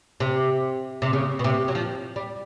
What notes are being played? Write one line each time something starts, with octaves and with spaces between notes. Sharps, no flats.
C3
C3
C#3
B2
C3
F#3
F3
G3